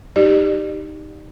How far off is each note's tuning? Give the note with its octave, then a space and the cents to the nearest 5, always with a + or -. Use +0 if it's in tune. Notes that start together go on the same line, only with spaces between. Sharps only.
D#4 +0 G4 -5 D5 +30